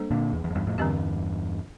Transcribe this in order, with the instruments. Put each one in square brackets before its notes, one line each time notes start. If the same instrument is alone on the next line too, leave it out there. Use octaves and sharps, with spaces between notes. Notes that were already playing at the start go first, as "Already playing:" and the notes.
Already playing: [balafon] G3 A#3 D4 A4 C5
[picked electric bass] A#2 D3
E2
E2
F2
E2 G2
F2 A2
[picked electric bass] E2 G2 [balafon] D3 G3 C4 G4